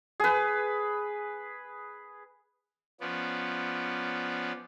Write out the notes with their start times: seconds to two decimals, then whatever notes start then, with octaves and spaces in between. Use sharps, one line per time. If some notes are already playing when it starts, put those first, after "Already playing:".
0.20 G#4 B4
3.01 F3 B3 C#4 D5